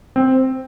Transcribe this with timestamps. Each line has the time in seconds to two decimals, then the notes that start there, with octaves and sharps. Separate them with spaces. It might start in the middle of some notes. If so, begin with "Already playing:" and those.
0.16 C4